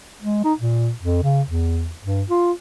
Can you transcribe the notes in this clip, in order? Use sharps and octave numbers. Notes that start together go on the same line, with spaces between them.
G#3
D#4
A#2
F2
C#3
E2
G2
F4